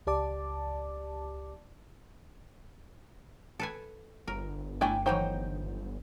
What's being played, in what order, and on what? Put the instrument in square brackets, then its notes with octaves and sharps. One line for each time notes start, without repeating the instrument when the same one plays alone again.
[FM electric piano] C#2 G4 D5 A5 D6
[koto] A4 B4 G#5
[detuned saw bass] G1 [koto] A#4
[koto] A3 D4 [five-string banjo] E4 G5 G#5
[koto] D#3 E3 F#3 [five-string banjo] D#4 C5 G5